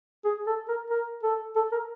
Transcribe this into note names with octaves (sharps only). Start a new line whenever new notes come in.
G#4
A4
A#4
A#4
A4
A4
A#4